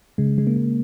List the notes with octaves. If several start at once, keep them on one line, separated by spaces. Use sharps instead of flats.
C#3 G#3
C#3 G#3
A#3
G#3